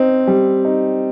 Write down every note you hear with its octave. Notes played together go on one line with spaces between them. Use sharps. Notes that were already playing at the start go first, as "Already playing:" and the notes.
Already playing: C4 D#4
G3
D#4